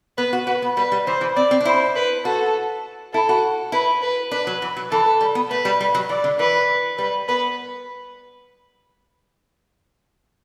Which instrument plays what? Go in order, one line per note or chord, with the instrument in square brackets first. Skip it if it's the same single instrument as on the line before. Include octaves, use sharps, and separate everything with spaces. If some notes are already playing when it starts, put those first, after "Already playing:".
[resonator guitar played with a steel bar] B3 [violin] B4
[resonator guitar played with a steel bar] F#4
[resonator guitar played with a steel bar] F#4 [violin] B4
[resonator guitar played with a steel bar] B3
[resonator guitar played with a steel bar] G3 [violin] B4
[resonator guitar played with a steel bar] G3
[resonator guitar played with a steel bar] E3 [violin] C5
[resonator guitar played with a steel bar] E3
[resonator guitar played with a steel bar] C4 [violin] D5
[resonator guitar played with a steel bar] C4
D4
[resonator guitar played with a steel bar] E4 [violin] C5
[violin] B4
[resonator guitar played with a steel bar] F#4 [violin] A4
[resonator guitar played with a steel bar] E4 [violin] A4
[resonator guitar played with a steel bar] F#4
[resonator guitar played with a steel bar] E4 [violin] B4
[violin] B4
[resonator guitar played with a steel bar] D4 [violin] B4
[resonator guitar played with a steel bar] F#3
E3
F#3
[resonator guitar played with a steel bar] E3 [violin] A4
[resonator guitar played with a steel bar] G3
B3
[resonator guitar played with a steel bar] A3 [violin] B4
[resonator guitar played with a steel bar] G3
G3
F#3
[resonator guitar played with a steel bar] E3 [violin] D5
[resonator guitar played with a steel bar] D3
[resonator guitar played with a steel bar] E3 [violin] B4
[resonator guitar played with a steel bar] G3 [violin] B4
[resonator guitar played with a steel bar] B3 [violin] B4